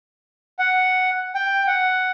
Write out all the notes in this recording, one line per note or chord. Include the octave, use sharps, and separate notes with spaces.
F#5
G5
F#5